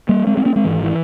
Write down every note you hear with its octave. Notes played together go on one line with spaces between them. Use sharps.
G3 A#3
G#3 C4
G#3 C4
A#3 C#4
G#3 C4
G#1 G#2 E3
E3